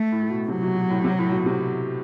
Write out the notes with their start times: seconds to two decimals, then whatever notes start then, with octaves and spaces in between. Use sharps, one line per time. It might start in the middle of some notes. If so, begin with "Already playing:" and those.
Already playing: A3
0.12 A2
0.23 A2
0.30 B2
0.48 C3 F#3
0.63 B2
0.77 B2
0.90 A2
1.04 C3
1.18 A2
1.32 B2
1.46 C3